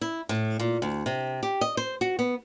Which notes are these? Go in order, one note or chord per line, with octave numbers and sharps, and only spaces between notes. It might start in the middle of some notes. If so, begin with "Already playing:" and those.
E4
A2
A#2
D2
C3
G4
D#5
C5
F#4
B3